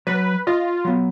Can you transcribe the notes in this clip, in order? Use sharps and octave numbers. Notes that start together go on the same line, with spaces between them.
F#3 B4 B5
F4 D#5
F#3 B3